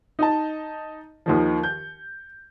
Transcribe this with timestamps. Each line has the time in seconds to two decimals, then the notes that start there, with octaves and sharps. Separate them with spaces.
0.19 D#4 D#5 A5
1.26 D#2 D#3 F3
1.63 G6